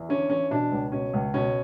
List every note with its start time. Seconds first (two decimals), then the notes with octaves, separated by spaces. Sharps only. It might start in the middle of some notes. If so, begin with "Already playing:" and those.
Already playing: E2
0.09 D3 C#4
0.30 E2 C#4
0.50 B2 D4
0.72 C#2
0.92 B2 C#4
1.14 C#2
1.34 B2 C#4